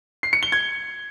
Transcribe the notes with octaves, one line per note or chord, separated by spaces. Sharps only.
C7
C#7
G7
G#6